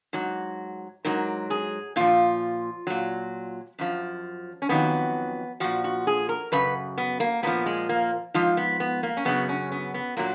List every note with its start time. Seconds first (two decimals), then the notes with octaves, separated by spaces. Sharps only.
0.13 G#2 F#3
1.05 G#2 F#3 A#4
1.50 G#4
1.96 A#2 F3 F4
2.87 A#2 F#3
3.79 F#2 F3
4.62 C#4
4.69 F2 D#3 F#3 B3
5.60 A#2 F3 F#4
5.84 F#4
6.07 G#4
6.29 A#4
6.52 F#2 C#3 B4
6.98 B3
7.20 A#3
7.43 A#2 F3 B3
7.66 G#3
7.89 A#3
8.34 G#2 F3 F4
8.57 B3
8.80 B3
9.03 A#3
9.17 C#4
9.25 F#2 C#3 F#3 B3
9.49 C#4
9.72 B3
9.94 B3
10.17 A#2 F#3 A#3